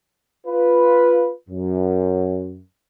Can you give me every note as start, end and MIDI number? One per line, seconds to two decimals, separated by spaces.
0.47 1.29 65
0.47 1.29 71
1.48 2.59 42